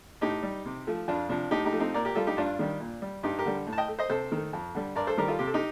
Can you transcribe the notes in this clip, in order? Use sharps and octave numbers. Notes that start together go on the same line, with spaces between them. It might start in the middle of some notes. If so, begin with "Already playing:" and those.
A2 D#4 G4
G3
C3
F3 A3
F2 D4 F4
C3 F3 D4
A2 D#4 G4
D#4 G4
F3 A3
C4 D#4
A#2 A#4 D5
G4 A#4
G3 F4 A4
D#4 G4
G2 D4 F4
D#3 G3
A#2
G3
G2 D#4 G4
G4 A#4
D3 G3
A2
A5
D#5 G5
A3
C5 D#5
C3 A4 C5
D#3 A3
F2
D3 G3
G2 A#4 D5
A4 C5
D#3 G3 G4 A#4
F4 A4
C3 G4
A4
D#4 G4